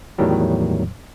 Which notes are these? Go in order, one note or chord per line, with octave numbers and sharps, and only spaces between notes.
E2 A2 D#3 F#3 G3